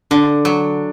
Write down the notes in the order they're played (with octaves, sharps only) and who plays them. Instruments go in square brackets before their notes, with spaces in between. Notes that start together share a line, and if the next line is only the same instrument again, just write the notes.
[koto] D3 [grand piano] D4
[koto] F#3